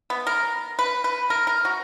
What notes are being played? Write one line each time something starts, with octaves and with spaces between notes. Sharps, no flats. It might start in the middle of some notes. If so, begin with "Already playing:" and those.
B3
A#4
B4
B4
A#4
A#4
F#4